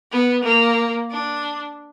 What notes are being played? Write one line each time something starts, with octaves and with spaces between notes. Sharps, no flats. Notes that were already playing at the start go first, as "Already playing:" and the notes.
B3
A#3
D4